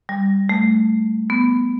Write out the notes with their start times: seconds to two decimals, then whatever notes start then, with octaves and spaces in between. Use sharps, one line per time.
0.09 G3
0.49 A3
1.30 B3